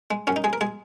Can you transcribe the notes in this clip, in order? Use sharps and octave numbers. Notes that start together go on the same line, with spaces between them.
G#3
F#2 C#4
D#4
G#3 G#4
A#4
G#3 G#4